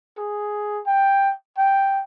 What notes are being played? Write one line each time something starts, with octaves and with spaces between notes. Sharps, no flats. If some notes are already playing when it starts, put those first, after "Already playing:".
G#4
G5
G5